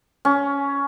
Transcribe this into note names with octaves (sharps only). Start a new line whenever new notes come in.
C#4